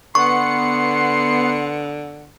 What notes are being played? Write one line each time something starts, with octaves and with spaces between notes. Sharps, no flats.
D3 B3 F#5 C6 C#6 C#7